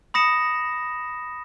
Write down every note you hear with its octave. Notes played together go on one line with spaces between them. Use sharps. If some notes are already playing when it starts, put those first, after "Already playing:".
B5 D#6 A#6 C#7 E7